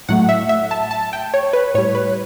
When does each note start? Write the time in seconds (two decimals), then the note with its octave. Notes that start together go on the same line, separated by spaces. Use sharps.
0.09 A2 F#3 A3 F#5
0.29 E5
0.49 E5
0.71 A5
0.91 A5
1.13 G5
1.34 C#5
1.53 B4
1.74 A2 G3 C#5
1.95 B4